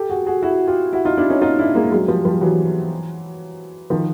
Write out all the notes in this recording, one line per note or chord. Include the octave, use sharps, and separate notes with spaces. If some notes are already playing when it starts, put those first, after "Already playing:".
Already playing: G4 A4
F#4 G#4
F#4 G#4
E4 F#4
F4 G4
E4 F#4
D#4 F4
D4 E4
C#4 D#4
D#4 F4
D4 E4
G#3 A#3
F#3 G#3
F3 G3
F3 G3
E3 F#3
D#3 F3